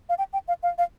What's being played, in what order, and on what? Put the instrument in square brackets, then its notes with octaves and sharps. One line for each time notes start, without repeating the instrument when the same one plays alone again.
[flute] F5
G5
G5
F5
F5
F5